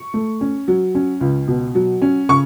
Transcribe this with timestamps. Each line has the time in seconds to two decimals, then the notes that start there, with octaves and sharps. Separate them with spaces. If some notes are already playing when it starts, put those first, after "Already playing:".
Already playing: C#6
0.14 A3
0.41 C#4
0.68 F#3
0.95 C#4
1.21 C#2
1.48 B2
1.75 F#3
2.02 C#4
2.29 C#3 C#6